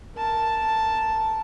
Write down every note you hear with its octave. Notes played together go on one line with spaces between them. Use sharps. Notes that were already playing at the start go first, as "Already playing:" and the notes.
A#4 A5